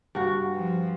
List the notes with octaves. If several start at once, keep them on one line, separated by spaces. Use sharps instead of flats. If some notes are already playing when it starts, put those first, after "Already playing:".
G2 F#4
F3